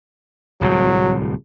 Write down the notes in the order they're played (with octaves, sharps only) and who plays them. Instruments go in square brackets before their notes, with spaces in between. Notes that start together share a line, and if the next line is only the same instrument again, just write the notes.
[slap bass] D1 C2 A2 [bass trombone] F#3